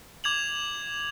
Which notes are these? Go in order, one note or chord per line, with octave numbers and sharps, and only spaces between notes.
D6 G#6 F7 F#7